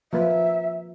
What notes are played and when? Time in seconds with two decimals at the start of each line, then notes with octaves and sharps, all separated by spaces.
0.13 F3 A#3 B4 E5